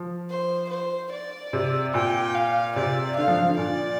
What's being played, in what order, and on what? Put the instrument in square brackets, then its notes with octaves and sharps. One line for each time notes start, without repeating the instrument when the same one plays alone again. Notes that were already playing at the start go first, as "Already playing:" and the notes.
Already playing: [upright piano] F3
[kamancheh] C5
C5
D5
[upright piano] C3
[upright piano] A#2 [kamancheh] G5
[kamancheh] F5
[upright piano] C3 [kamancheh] D5
[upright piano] D3 [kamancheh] F5
[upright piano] F3
F3
D3
[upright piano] A#2 [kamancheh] D5